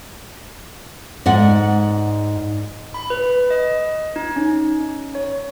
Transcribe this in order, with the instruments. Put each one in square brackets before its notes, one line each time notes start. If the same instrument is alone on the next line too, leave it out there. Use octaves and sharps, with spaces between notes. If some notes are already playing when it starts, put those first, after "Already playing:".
[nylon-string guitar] G#2 D5 F#5
[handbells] B5
B4
D#5
D#4
C#4
C#5